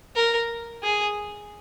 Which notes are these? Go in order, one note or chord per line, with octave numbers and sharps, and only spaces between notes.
A#4
G#4